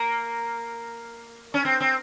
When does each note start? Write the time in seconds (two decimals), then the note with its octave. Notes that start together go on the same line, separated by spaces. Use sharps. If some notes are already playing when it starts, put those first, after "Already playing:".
Already playing: A#3
1.54 C#4
1.65 C4
1.80 C4